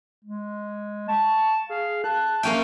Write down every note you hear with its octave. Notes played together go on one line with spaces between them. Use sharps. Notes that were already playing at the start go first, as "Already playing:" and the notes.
G#3
A5 C#6
G#4 F5
A5 F#6
A#3 C#4 E5 G5